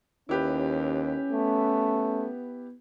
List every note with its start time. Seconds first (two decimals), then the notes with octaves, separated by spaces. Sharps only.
0.29 D#2 C#4 E4 G4 B4
1.31 A3 B3